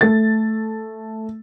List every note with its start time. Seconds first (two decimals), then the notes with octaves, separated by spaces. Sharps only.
0.01 A3 A6